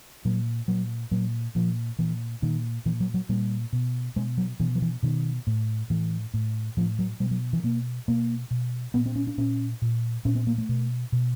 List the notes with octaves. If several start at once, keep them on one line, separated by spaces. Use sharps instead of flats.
A#2 F#3
A#2 F#3
A#2 F#3
A#2 F3
A#2 E3
A#2 D#3
A#2 E3
F#3
F#3
A#2 G3
B2
B2 G#3
F#3
B2 E3
F3
E3
B2 D#3
A2
A2 E3
A2
A2 F3
F#3
B2 G3
F#3
E3
B2 A#3
B2 A#3
B2
A#2 B3
C4
C#4
D4
A#2 C#4
A#2
A#2 C#4
C4
A#3
A3
B2
B2